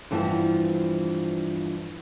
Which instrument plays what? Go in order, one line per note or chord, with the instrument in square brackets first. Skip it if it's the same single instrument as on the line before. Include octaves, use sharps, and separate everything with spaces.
[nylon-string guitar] G2 E3 F3 B3